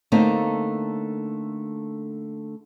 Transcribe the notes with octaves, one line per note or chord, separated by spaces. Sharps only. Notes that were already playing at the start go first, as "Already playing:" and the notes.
D3 A3 A#3 C4 D#4